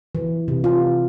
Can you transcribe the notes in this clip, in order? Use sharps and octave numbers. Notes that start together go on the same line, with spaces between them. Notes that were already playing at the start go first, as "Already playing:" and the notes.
E3
C3
F4